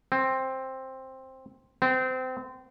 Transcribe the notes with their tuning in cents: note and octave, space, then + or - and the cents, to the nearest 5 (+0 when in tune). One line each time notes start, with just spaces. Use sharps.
C4 +10
C4 -25